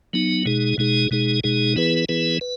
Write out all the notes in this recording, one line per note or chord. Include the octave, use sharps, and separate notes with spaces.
F#3 B3 D#4
B2 G#3 D#4 G#4
B2 G#3 D#4 G#4
B2 G#3 D#4 G#4
B2 G#3 D#4 G#4
E3 B3 E4 G#4 B4
E3 B3 E4 G#4 B4
B4